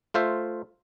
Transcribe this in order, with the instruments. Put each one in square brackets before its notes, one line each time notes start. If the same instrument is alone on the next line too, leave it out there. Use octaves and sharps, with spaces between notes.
[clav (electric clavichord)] A3 F4 C5 E5